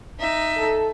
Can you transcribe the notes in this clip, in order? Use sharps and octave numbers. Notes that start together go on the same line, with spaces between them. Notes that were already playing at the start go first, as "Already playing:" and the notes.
D#4 E5
A4